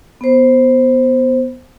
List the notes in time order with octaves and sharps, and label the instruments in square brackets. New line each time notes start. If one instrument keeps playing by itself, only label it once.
[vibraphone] B3 C5